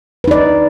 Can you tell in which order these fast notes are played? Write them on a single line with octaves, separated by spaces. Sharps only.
B4 D#4 D5